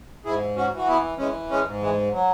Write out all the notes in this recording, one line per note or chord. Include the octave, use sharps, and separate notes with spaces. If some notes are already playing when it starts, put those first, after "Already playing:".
G#2 E4 G#4
C#4 F#4
E3 F#4
B3 E4
E3 G#3 C#4
G#3 C#4
G#2
E3 G#3
F#3